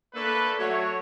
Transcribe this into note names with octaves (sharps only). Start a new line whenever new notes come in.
A3 A#3 D4 A4 B4
F#3 A3 F#4 C#5